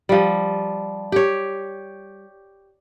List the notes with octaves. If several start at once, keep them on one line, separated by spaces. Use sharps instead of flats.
F3 G3
G4 C#5